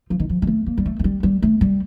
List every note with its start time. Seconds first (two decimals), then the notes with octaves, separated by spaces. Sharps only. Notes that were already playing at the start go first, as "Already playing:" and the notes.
0.10 F3
0.20 D#3
0.29 F3
0.42 G3
0.47 A3
0.66 A#3
0.78 G3
0.86 A3
0.99 A3
1.04 G3
1.23 G3
1.42 A3
1.61 G3